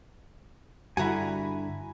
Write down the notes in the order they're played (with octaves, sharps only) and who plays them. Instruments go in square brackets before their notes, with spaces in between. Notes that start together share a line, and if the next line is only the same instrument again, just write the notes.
[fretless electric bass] G2 D3 [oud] E4 F#4 [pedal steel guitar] G#5 A#5 B5